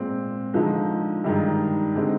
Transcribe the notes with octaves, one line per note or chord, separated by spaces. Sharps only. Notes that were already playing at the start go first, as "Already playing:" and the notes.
Already playing: A#2 G#3 C4
D3 F3 G#3 D#4
G2 D#3 G#3 D#4
D3 G#3 C4 D#4